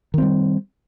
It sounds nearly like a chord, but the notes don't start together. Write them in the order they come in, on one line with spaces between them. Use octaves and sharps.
D#3 C4 G3